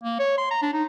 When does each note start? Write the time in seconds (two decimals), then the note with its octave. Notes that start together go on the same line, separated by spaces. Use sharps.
0.03 A#3
0.20 C#5
0.38 C6
0.50 A#5
0.62 D4
0.73 D#4